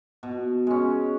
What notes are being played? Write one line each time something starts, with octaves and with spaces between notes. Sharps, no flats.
B2
G#3 C#4